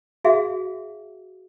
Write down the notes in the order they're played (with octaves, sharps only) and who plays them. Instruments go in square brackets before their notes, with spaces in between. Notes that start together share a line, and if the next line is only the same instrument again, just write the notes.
[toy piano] F#4 G#4 E5 F5